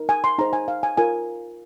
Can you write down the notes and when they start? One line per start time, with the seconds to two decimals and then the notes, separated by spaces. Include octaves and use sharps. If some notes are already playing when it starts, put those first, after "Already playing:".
Already playing: D#4 A#4
0.09 G#5
0.24 C6
0.38 D#4 G#4 C5 A#5
0.53 G#5
0.68 F5
0.83 G#5
0.97 F4 A#4 G#5